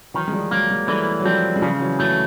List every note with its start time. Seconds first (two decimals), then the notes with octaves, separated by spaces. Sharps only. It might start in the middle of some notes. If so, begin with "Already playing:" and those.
0.14 D#3 E3 F#3
0.28 G#3
0.32 F3 G3
0.51 F#3 G#3 A#3
0.69 F#3 G#3
0.88 E3 G3 A3
1.20 F#3
1.25 F3 G3 C4
1.56 G#3
1.62 C#3 F3 G3
1.80 E3 F#3
1.99 E3 F#3 A3